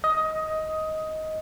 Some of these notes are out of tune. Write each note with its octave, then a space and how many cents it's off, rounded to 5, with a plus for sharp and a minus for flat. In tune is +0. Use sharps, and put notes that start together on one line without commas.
D#5 +15